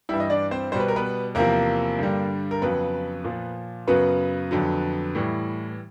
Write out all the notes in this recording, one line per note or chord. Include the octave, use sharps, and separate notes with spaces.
G2 E3 G3 E4 E5
D#5
D4 D5
C4 C5
B2 G3 C5
B4
A#4
B3 B4
E2 C3 F3 A#3 A#4
G2 D3 G3
A#4
F2 C#3 F#3 B3 B4
A#2 F3
F#2 C#3 F#3 B3 B4
F2 D3 F#3
A2 E3 G3